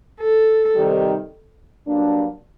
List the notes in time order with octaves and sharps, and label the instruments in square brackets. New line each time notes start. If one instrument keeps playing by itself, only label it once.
[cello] A4
[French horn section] C3 D#3 G3
G2 F#3 A#3 D4